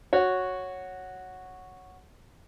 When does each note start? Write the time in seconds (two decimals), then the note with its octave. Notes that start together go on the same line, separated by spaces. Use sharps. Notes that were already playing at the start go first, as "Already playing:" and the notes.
0.13 F#4 C#5